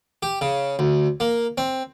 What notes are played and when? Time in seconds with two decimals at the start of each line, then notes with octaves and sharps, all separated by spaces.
0.23 G4
0.41 C#3
0.79 D2
1.20 A#3
1.58 C4